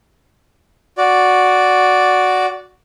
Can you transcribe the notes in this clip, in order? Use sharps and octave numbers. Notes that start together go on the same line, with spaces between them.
F#4 D5